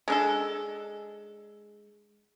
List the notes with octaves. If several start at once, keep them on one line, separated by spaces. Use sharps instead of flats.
G#3 D4 A4